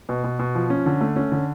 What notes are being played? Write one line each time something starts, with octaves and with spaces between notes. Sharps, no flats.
B2
B2
B2
F3
C#4
D3
A3
C#4
D3